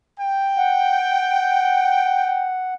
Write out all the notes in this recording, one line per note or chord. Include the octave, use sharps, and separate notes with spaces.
G5
F#5